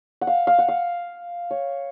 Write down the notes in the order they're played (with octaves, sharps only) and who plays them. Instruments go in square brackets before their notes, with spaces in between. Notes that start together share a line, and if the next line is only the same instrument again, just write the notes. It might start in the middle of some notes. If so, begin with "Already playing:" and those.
[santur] F#5
F5
F5
F#5
F5
C#5